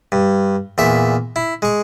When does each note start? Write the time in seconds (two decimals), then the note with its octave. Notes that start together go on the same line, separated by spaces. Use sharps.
0.12 G2
0.78 E2 A#2 E5 C#6
1.36 E4
1.62 G#3 C#6